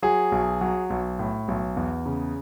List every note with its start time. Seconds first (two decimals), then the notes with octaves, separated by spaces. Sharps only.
0.02 F#3 G#4
0.32 B1
0.61 F#3
0.90 B1
1.19 A2
1.48 B1
1.77 E2
2.06 C#3